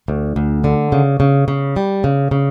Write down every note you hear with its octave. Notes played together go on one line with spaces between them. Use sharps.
D2
D2
D3
C#3
C#3
C#3
G3
C#3
C#3